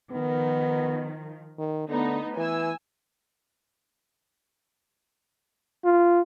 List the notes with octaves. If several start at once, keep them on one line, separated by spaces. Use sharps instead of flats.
D#3 F3 B3
D#3
D3 A3 B3 D#4
E3 G#5 E6
F4